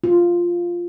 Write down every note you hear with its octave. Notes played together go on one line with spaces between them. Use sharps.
F4